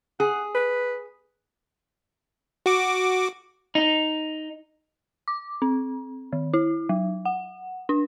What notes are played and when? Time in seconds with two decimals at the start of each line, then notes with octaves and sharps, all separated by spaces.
0.20 G#4 F#5
0.55 B4
2.66 F#4 D6
3.75 D#4
5.28 D6
5.62 C4
6.33 D#3
6.54 E4
6.89 F#3
7.25 F#5
7.89 D4